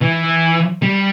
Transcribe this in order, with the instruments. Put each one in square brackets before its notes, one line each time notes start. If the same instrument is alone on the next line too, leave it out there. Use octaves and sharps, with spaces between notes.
[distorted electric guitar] E3
G3